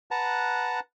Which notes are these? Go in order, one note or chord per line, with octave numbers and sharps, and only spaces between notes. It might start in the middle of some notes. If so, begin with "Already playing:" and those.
B4 F#5 A5 A#5